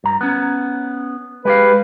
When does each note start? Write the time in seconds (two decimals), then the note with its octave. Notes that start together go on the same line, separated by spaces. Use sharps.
0.04 G2 A#5
0.21 B3 C#4
1.45 G#3 G4 B4 F5